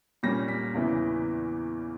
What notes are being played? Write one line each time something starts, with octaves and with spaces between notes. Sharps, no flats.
A#2 G3 C#4 A#6
B6
E2 C#3 E3